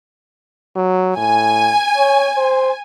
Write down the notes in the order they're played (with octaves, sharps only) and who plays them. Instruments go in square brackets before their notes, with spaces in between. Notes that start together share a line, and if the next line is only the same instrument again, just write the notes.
[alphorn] F#3
[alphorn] A2 [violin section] G#5
[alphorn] C#5
C5